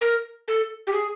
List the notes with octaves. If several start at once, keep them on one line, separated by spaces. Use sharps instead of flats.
A#4
A4
G4
G#4